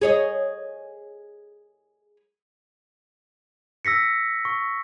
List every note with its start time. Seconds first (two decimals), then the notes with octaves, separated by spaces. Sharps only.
0.02 G#4 C#5 D#5
3.85 E6 A#6 B6 C#7
4.45 C#6